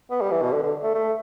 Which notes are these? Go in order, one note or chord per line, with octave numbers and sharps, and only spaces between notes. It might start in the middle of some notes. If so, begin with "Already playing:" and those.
B3
G3
E3
B2
D3
D3
A3
A3